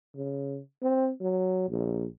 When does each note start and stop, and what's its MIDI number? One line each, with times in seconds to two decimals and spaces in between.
0.16 0.59 49
0.82 1.10 60
1.21 1.65 54
1.69 2.06 34